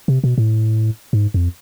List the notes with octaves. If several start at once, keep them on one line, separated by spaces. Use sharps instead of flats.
C3
B2
A2
G#2
F2